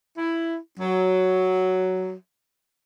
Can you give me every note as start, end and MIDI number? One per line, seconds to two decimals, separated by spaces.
0.18 0.57 64
0.79 2.15 54